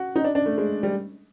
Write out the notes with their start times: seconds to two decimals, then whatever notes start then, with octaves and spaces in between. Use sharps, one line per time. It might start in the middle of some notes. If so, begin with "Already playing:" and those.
Already playing: F#4
0.16 D#4
0.24 D4
0.35 D4
0.46 A3
0.58 G#3
0.83 G3